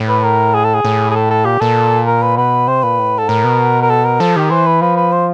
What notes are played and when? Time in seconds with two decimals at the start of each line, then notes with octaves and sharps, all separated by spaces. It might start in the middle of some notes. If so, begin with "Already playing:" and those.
Already playing: A2
0.08 B4
0.24 A#4
0.54 G#4
0.64 A4
0.74 G#4
0.85 A2
1.11 G#4
1.15 A4
1.30 A4
1.45 A#2 G4
1.60 A#2 A4
2.07 A#4
2.22 B4
2.37 B2 B4
2.67 C3 C5
2.83 A#2 B4
2.99 A2
3.18 G#2 A4
3.29 A2 A#4
3.44 B2
3.82 A#4
3.90 A4
4.05 A#4
4.20 F3 A4
4.36 D#3 G4
4.50 E3 C5
4.66 B4
4.81 F3 B4
4.97 B4
5.12 C5